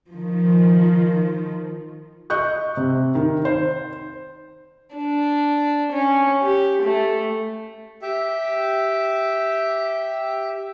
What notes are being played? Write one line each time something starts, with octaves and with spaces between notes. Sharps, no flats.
D#3 F3
D#5 C#6 F#6 G6
C3
D#3
C5
D4
C#4
G4
A3
G4 E5